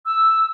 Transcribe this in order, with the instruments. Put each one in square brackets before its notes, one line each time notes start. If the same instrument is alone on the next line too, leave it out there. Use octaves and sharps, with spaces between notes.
[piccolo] E6